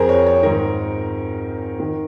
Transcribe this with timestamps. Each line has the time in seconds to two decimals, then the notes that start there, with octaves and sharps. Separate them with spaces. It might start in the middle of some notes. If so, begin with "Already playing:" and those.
Already playing: F2 G#4 A#4 C5
0.09 C#5
0.27 C#5
0.43 G#2 D#3 A#4
1.80 D#3